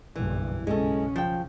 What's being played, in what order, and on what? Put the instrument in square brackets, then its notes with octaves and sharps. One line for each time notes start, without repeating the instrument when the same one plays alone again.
[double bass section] F#1 B1 G2 [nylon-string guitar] E3
[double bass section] B1 C#3 C#4 [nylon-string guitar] G#3 A4
[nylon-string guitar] F3 G5